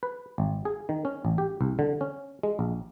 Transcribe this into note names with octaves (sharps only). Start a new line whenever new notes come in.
B4
G#1
G#4
D#3
C#4
A1
G4
C2
D3
C#4
G#3
A#1